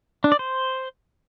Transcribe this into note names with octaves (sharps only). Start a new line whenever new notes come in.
D4
D5
C5